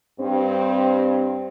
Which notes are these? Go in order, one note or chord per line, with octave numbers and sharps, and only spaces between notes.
G2 C4